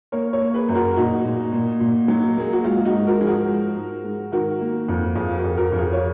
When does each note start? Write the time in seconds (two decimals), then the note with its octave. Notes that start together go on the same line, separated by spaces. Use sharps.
0.12 A#3 A#4 C#5
0.33 A#4 C#5
0.41 A#3
0.54 G#4 B4
0.69 F#2
0.75 F#4 A#4
0.96 A#2 D#4 F#4
1.25 A#2
1.52 A#2
1.80 A#2
2.08 F#3
2.37 A#3 G#4
2.53 F#4
2.64 G#3 F4
2.85 D#4 F#4
2.93 G#2
3.07 F#4 A#4
3.21 F3 G#4
3.27 F#4 A#4
3.48 G#3
3.76 G#2
4.04 G#2
4.32 D#3 F#4 A#4
4.61 A#3
4.88 F2
5.16 F2 F4 G#4
5.31 G#4
5.38 F#4 A#4
5.44 F2
5.57 F#4 A#4
5.72 F2
5.78 F4 G#4
5.93 C#5